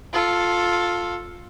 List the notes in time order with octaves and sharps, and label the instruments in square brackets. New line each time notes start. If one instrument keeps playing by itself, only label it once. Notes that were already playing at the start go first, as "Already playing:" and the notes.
[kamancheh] F4 A4